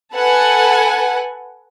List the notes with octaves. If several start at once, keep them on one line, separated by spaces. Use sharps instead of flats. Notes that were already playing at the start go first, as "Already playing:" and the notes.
A4 B4 F#5 G#5